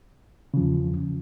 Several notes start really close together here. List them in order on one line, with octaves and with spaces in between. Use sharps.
C#3 F3 E2